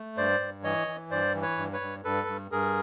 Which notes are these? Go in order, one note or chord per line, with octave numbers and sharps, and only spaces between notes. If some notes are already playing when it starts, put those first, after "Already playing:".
Already playing: A3
G2 C5 D5
G2
E3 C#5 D#5
E3
G2 C5 D5
E3
B4 C#5
G2
B4 C#5
G2
G2 A4 B4
G2
G2 G#4 A#4